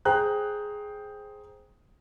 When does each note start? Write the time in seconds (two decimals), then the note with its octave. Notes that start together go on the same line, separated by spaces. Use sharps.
0.05 G#4 C5 G5 A#5 F#6